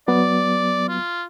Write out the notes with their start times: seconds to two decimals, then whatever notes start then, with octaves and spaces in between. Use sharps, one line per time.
0.08 F#3 B3 D5
0.88 F4